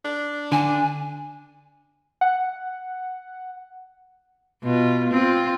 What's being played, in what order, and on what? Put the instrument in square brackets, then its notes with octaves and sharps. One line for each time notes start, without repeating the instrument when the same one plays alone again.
[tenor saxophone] D4
[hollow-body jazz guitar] D3 [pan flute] G#5
[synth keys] F#5
[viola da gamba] B2 F4
C4 F4